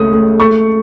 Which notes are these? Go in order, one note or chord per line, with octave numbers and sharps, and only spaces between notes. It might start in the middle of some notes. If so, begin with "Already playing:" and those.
Already playing: C#2 A3 D#6
A3
A3 C#6